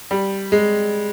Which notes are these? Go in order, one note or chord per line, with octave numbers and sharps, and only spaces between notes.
G3
G#3